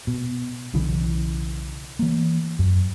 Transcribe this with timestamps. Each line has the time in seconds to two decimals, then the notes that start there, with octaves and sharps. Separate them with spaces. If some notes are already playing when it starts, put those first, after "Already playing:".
0.07 B2
0.74 B1 C#3 E3
1.99 E3 A#3
2.59 F#2